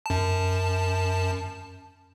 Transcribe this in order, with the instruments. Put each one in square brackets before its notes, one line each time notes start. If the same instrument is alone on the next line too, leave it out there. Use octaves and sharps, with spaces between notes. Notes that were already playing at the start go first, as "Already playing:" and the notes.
[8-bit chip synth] F#2 A5